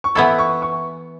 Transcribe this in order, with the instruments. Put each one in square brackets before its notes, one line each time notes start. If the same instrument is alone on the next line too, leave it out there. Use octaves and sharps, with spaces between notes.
[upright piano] C#6
[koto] E3 B3 E4 A4 [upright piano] B5
[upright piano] C#6
C#6